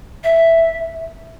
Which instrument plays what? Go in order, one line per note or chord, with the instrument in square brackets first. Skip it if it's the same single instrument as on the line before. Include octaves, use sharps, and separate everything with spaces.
[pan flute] E5